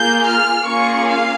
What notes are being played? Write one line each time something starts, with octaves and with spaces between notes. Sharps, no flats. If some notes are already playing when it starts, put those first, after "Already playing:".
Already playing: A#3 F4 G#4 G6
F6
A#3 C#4 F4 G#4 C#6
F5